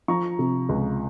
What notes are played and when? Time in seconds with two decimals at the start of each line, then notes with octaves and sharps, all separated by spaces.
0.08 F3 A#5 C#6
0.39 C3
0.69 C#2